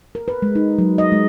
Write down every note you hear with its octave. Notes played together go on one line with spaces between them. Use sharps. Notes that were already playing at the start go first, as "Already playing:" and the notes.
A#4
B4
G#3
D#4
F#3
D#5
G#3